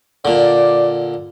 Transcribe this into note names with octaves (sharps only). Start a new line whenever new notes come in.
A#2 D3 D5